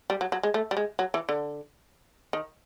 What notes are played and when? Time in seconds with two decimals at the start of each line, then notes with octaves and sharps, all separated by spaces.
0.10 G3
0.21 F#3
0.32 F#3
0.43 G#3
0.54 A3
0.71 G3
0.77 G#3
0.99 F#3
1.14 E3
1.29 D3
2.33 D#3